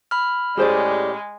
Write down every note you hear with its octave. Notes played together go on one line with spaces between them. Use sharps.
B5 F6
A2 G#3 C#4 G4 G#4 C5 D5